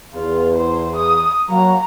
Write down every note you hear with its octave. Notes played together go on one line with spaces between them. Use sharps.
E2 F4
C5
D#6
F#3 A#3 F#4 A#5